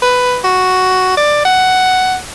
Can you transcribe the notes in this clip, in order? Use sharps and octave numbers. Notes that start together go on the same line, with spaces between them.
B4
F#4
D5
F#5